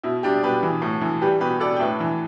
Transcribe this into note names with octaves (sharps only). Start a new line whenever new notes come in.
B2 E4
G3 D4 G4
B2 G4 B4
E3
A2
E3
G3 G4 B4
B2 G4 B4
B2 A4 D5
G5
A2 B4 E5
E3